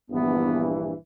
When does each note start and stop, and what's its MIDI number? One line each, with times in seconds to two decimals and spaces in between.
0.11 0.92 34
0.11 0.92 43
0.11 0.92 52
0.11 0.70 59